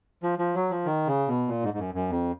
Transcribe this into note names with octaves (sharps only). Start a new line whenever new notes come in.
F3
F3
F#3
F3
D#3
C#3
B2
A#2
G#2
G#2
F#2
F#2
F2